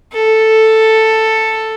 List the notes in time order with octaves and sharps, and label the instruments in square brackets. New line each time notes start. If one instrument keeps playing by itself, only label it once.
[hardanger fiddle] A4